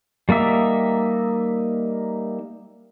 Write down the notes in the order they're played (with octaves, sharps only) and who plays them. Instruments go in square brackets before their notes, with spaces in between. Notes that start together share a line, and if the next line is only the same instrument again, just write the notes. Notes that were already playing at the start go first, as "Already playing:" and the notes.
[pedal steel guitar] G3 A#3 D#4 E5